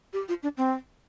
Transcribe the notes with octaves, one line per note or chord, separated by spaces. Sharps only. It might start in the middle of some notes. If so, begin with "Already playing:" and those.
G4
F4
D4
C4